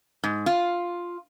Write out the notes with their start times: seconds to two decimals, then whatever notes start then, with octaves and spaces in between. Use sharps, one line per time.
0.23 G#2
0.46 F4